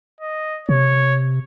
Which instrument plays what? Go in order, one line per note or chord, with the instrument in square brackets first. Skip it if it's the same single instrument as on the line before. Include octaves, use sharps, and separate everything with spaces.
[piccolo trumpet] D#5
[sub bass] C3 [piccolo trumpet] C#5